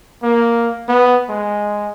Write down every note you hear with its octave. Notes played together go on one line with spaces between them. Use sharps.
A#3
B3
G#3